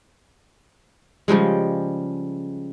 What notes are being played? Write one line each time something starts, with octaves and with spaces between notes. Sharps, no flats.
C#3 F3 G3 G#3